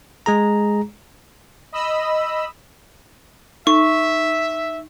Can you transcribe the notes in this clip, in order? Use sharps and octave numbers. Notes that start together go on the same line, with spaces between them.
G#3 G#4 A#5
D#5 B5 E6
D#4 E5 C#6